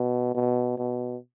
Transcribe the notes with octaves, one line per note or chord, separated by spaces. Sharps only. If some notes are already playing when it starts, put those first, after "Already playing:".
Already playing: B2
B2
B2